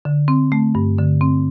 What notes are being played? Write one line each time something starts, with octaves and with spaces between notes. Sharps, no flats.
D3
C4
A3
G2
D3
C4